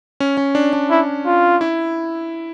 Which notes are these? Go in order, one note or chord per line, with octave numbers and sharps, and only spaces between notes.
C#4
C#4
D4
D4
E4
F4
E4